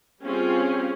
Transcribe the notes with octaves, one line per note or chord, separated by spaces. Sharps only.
G3 C4 C#4 F4 G#4